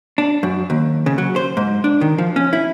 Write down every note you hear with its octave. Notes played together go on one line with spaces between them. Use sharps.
D4
F#2
D#2
C#3
F#3
C5
G#2
D4
D#3
F3
C#4
E4